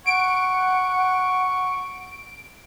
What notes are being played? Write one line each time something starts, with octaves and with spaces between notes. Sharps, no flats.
F#5 C#6 D7